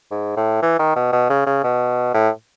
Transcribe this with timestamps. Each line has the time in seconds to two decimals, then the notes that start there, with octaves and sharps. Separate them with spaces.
0.11 G#2
0.37 A2
0.62 E3
0.79 D#3
0.96 B2
1.13 B2
1.30 C#3
1.47 C#3
1.64 B2
2.14 A2